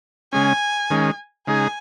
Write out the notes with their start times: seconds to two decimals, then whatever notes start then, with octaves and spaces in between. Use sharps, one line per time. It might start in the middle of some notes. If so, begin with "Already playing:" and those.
0.33 C#3 G#3 C#4 G#5
0.90 D#3 G#3 C#4
1.47 C#3 G#3 D#4 G#4 G#5